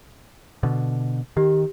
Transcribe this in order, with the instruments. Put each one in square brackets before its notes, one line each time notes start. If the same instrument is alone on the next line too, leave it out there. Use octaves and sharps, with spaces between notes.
[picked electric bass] B2 D3
[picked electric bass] D#3 [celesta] G4